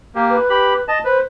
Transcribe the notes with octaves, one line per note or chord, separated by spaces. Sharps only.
A#3 G4
B4
G4 B5
D#5 A5
B4 C5